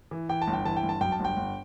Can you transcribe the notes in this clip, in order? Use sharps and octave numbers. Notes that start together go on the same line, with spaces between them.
E3
E3 G5
A5
G1
G5
E3 A5
G5
G1
A5
F#2 G5
A5
G1 G5
G1